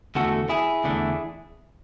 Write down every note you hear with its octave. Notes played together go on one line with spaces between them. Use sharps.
E2 D3 A3 F#4 A4
E4 G#4
E2 D3 A3